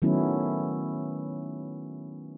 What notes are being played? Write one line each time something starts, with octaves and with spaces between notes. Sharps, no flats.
D#3 F#3 A3 B3 C#4 E4